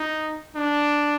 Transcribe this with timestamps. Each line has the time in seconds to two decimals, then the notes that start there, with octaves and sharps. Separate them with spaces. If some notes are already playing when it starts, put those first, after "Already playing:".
Already playing: D#4
0.56 D4